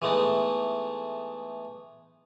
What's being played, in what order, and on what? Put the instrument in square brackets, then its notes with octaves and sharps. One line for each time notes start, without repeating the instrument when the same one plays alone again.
[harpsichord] E3 G#3 A3 B3 D#4